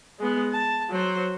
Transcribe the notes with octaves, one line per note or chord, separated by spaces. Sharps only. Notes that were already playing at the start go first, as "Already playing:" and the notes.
G#3 B3
A5
F#3 C5